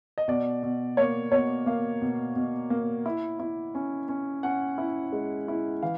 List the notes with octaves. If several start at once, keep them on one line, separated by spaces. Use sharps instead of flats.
D#5
B2 D5
B2
A#3 C#5
B2 C#5
A#3 F5
B2
B2
A#3
E4
E4
C#4
C#4
C#4 F#5
E4
G#3
E4
E3 F5